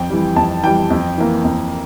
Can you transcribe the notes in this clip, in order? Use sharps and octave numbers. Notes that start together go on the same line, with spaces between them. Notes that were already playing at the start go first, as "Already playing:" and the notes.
Already playing: F2 G5
E3 G3
F2 A5
E3 G3 G5
F2
E3 A#3
F2